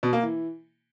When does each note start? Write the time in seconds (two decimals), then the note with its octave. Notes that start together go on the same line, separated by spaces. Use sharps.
0.03 B2
0.13 A#3
0.23 E3